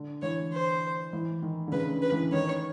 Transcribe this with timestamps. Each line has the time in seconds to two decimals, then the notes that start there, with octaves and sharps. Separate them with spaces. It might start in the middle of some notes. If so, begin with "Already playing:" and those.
Already playing: D3
0.22 E3 C#5
0.52 C5
1.13 E3
1.42 D#3
1.67 D3
1.72 C#3 B4
2.02 B4
2.12 E3
2.32 D#3 C#5